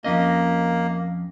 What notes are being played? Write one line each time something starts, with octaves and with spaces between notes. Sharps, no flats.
F2 A#3 C#4 D#5